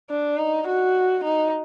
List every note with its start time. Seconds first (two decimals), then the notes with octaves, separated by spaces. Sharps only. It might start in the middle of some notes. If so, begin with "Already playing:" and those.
0.10 D4
0.38 D#4
0.68 F#4
1.24 D#4